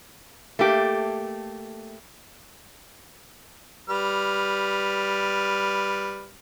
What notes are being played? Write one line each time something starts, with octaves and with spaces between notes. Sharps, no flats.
A3 A#3 G4
G3 B4 F6